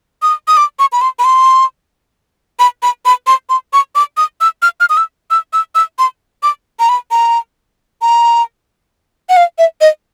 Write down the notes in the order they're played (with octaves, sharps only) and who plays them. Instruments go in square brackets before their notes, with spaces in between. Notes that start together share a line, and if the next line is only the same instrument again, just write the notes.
[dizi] D#6
D#6
D6
C#6
B5
C6
B5
C6
B5
B5
B5
C6
C6
C#6
D6
D#6
E6
F6
F6
D#6
E6
E6
E6
E6
C6
D6
A#5
B5
A#5
A#5
F#5
F5
E5
D#5